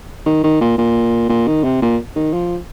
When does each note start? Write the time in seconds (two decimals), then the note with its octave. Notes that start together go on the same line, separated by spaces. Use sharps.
0.26 D#3
0.43 D#3
0.61 A#2
0.78 A#2
1.29 A#2
1.47 D#3
1.64 C3
1.82 A#2
2.16 D#3
2.33 F3